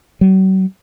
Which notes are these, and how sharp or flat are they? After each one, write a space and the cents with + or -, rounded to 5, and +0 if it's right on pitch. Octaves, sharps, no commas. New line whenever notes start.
F#3 +45